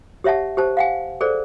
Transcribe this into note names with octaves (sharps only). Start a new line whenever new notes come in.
G4 C#5 E5 F#5 A5
G4 C5 A5
F5 F#5 G#5
G#4 A4 C5 D5